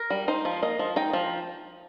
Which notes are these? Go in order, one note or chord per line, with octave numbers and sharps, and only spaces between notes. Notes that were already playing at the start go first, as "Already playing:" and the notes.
Already playing: A#4
G3
D#4 C5
F3
A#3 D#5
F3
D#4 G5
F3